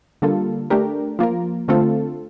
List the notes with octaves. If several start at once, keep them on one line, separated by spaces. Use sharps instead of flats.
D3 G3 A#3 F4 A4
A3 D4 G4 A#4
F3 A#3 F4 A#4
D3 A3 C4 F4 A4